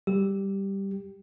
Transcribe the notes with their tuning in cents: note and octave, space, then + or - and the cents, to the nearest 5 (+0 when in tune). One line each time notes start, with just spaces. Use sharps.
G3 +0 G4 +0